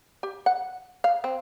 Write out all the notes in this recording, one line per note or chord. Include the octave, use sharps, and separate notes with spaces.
G4
F#5
F5
C4